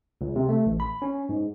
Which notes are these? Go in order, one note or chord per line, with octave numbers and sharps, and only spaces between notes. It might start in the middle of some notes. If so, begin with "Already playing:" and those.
C#2
C3
A3
A1
B5
C#4
G#2